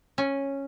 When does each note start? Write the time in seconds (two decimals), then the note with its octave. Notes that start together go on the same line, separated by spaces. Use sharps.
0.18 C#4